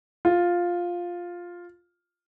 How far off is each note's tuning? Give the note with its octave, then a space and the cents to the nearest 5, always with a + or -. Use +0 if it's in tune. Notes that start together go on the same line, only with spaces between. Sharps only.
F4 +5